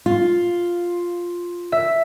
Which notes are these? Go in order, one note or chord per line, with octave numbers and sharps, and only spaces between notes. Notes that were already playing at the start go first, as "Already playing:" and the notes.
F4
E5